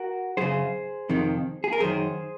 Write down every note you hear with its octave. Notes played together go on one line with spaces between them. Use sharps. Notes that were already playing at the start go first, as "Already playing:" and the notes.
Already playing: F#4 A#4
F#2 C#3 G#4 C5
F2 C3 D#3
G#4
A#4
F#2 D#3 G#4 C5